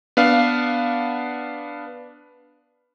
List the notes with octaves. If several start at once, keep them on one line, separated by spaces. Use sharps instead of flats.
B3 D4 F5